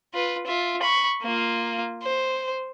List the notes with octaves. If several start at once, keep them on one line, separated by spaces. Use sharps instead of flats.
F4 B4
F4 E5
B5 C#6
A#3 F4
C5